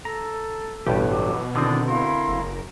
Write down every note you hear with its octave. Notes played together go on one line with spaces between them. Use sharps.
A4 A#5
A1 G2 B2 G3 G4
E3 F#3 D6
D3 D#3 C4 D4 E4 D5 D#6
E4 A#4 F5 C6
F#1